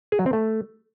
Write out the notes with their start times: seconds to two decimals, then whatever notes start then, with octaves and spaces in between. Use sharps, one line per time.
0.12 G#4
0.19 F#3
0.26 C4
0.33 A3